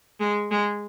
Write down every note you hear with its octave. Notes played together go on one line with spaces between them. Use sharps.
G#3
G#3